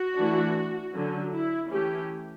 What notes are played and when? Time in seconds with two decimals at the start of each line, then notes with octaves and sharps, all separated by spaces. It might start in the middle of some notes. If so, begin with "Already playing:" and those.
Already playing: F#4
0.15 E3 A3 D4
0.94 D3 F#3 C#4
1.32 E4
1.71 E3 A3 C#4 G4